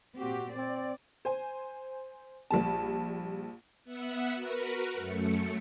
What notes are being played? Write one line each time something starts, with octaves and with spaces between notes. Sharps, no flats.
A#2 C4 F#4 G4
C4 D5
C5 G#5
A#1 G3 A5
B3 E5 F#5
F#4 A#4 B4
F#2 A3 C#7